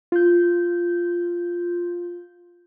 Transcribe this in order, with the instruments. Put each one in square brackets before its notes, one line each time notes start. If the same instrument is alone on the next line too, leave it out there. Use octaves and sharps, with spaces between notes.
[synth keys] F4 G6